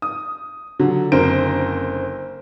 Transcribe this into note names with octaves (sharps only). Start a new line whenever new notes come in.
D#6
D3 F#3
F#1 D3 C4 A#4 C5 D7